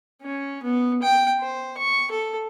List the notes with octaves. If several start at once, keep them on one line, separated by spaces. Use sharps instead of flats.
C#4
B3
G5
C5
C#6
A4